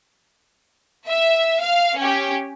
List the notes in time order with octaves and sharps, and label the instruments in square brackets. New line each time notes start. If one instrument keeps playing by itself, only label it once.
[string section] E5
F5
C#4 G4